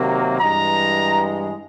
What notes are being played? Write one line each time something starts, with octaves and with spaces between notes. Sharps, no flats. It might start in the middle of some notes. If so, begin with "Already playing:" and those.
Already playing: C3 D#3 F#3 A#3
G2 E3 G#3 A#5